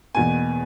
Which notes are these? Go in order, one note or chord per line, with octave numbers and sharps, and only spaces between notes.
E2 B2 A#3 G#5